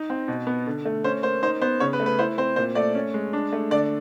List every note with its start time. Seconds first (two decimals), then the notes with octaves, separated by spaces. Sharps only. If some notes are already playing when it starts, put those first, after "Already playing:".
Already playing: D#4
0.10 C4
0.28 B2
0.47 B3
0.66 D3
0.85 A3
1.04 C#4 C5
1.23 A#3 C5
1.43 D#4 C5
1.62 B3 C5
1.80 C#3 C#5
1.93 B4
2.00 A3
2.06 B4
2.19 E4 C5
2.38 C4 C5
2.56 A#2 C5
2.75 A3 D5
2.95 C#4
3.14 G#3
3.33 D4
3.53 A3
3.71 D3 D5